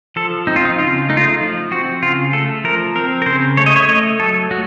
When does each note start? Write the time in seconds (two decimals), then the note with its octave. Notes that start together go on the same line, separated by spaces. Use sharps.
0.16 F3 A4
0.47 C4 D#4
0.56 F4
0.65 D#4
0.78 C#3 F4
1.09 A3 D#4
1.17 F4
1.24 D#4
1.40 F3
1.71 C4 F#4
2.02 C#3 F4
2.33 A3 A4
2.64 F3 A#4
2.95 C4 A#4
3.22 A#4
3.26 C#3 C5
3.57 A3 C#5
3.66 D#5
3.76 C#5
3.88 A3 D#5
4.20 F#3 A4
4.51 F#3 F#4